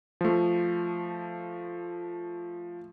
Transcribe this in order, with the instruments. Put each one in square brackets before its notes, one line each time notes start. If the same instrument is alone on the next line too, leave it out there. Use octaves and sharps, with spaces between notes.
[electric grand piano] F3 A3